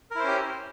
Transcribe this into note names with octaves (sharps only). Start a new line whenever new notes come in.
C#4 E4 G4 A#4 C5